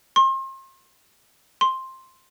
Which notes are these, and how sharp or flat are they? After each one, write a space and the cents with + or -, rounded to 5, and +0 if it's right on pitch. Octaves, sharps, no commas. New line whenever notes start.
C6 +35
C6 +5